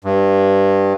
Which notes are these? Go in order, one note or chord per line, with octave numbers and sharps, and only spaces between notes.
G2